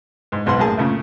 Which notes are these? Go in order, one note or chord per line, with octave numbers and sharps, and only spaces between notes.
G#2
B1 G#2 F#4 F#5 C6
F#2 A2 A#3 G#4 A5
A#2 C#3 A3